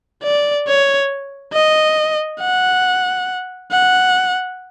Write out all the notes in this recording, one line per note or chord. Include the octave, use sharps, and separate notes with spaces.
D5
C#5
D#5
F#5
F#5